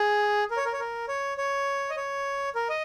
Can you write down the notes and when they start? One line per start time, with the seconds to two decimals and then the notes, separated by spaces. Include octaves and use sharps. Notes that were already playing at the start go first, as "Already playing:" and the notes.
Already playing: G#4
0.50 A#4
0.57 C#5
0.65 A#4
0.73 C#5
0.80 A#4
1.08 C#5
1.38 C#5
1.90 D#5
1.97 C#5
2.55 A#4
2.69 D#5